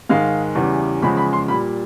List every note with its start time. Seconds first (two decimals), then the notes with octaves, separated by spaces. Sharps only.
0.09 G#2 D#3 G#3 F5
0.55 E2 C#3 E3 G3
1.02 E2 C#3 F3 G#3 B5
1.17 B5
1.33 C6
1.48 A#2 G3 B5